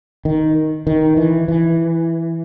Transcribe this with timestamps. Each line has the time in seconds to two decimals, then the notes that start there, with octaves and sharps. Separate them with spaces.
0.25 D#3
0.87 D#3
1.17 E3
1.48 E3